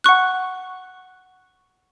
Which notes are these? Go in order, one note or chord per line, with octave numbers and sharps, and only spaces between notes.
F#5 C#6 F#6